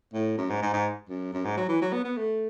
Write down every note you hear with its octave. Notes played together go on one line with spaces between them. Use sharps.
A2
F#2
G#2
G#2
G#2
F#2
F#2
G#2
F#3
E3
F#3
B3
B3
A3